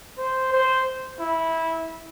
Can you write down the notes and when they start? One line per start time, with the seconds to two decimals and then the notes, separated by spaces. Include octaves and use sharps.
0.18 C5
0.52 C5
1.19 E4